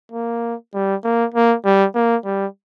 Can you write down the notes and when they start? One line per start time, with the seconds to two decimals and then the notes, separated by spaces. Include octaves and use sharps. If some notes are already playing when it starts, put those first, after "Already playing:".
0.12 A#3
0.74 G3
1.04 A#3
1.34 A#3
1.65 G3
1.95 A#3
2.25 G3